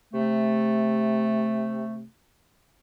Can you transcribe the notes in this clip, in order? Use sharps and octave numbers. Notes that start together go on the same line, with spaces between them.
C3 A3